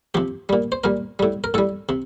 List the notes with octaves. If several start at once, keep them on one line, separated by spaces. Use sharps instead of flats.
C3 F3 G4
A#2 G3
C5
A#2 G3 A#4
A2 G3
A#4
A2 G3 A4
C3